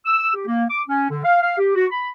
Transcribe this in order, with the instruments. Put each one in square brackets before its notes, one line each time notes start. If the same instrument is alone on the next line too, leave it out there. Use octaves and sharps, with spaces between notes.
[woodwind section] E6
G4
A#3
D6
C#4
D3
F5
F5
G4
F#4
B5